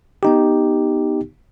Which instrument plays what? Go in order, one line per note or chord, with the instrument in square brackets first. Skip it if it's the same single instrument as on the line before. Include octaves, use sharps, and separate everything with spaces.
[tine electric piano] B3 D#4 G4